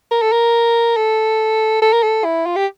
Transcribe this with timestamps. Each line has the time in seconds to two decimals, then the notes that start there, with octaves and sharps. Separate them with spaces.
0.12 A#4
0.22 A4
0.32 A#4
0.97 A4
1.82 A4
1.93 A#4
2.03 A4
2.25 E4
2.46 F4
2.56 G4